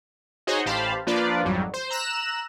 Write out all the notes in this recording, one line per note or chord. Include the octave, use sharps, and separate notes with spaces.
D#4 F#4 G#4 C5 C#5 D#5
A1 G4 C5 F5 A5 B5
F3 A#3 D4 F4 B4 D5
G#1 F2 F#3 G3
C5
A#5 E6 F#6 E7